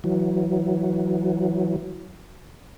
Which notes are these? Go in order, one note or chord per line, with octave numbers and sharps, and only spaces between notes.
E3 F#3